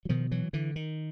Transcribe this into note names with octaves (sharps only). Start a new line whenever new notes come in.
F#3
B2 D#3 F3
E3 F#3
D3 E3
D#3